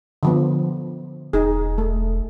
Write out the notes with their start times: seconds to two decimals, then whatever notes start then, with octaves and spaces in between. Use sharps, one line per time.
0.23 D3 F3 B3
1.33 E1 D#4 G#4
1.78 A3